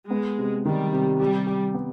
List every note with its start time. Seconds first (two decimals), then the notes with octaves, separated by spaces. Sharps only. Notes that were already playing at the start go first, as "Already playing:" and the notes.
0.11 G#3 B3
0.38 C3
0.65 D#3 G3
0.93 C3
1.20 G3 G4
1.47 G4
1.74 B3